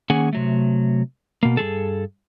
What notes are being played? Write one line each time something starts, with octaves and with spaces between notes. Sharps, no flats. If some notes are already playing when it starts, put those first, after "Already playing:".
D#3 A#3 C#4 G#4 F#5 G#5
C3 F#3 A3
B2 A#3
G2 G#3 G#4 A4